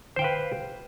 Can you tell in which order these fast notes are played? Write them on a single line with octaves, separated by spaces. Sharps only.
C5 G5 F5 B4